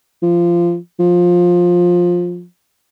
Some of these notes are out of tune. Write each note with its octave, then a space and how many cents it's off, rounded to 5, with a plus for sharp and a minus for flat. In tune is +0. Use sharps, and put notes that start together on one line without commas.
F3 -20
F3 +15